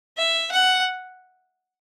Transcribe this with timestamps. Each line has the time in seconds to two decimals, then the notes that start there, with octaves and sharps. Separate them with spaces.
0.18 E5
0.51 F#5